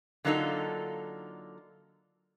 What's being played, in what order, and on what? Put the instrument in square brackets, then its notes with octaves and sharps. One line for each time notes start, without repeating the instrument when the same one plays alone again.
[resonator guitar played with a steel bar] D3 F#3 A#3 D#4 F4 A4